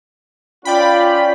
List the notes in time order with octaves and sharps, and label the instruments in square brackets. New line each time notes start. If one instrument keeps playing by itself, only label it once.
[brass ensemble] C#4 F4 [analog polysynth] D5 G5 B5